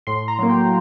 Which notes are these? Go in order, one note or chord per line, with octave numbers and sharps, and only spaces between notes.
A2 C6
A#5
F#3 A#3
G5